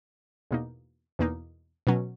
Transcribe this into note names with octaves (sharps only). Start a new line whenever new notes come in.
E2 B2 A#3 D#4
E2 B2 A#3 D#4
B2 F#3 C#4